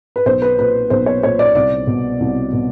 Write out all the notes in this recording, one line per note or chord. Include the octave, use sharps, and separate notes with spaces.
B4
B1 C5
B4
A#2 B4
B1 C5
C#5
A#2 C#5
D5
C2 D5
B2
C2
B2